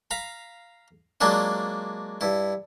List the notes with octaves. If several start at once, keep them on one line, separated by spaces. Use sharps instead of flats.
F5 A#5 B5
F#3 G#3 A#3 D4 F4
G2 E4